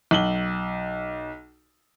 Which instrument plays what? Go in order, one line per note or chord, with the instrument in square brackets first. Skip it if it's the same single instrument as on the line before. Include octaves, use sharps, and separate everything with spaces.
[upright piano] B1 F#7 G7